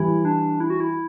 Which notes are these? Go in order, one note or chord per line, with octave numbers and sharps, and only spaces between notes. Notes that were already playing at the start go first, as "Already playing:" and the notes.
Already playing: E3 G3 E4
D4
E4
F#4
E4